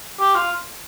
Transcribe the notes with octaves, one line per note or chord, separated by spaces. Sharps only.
G4
F4